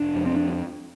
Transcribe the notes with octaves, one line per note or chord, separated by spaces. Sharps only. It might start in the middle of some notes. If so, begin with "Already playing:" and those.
Already playing: F1 D4
F2
C4
D4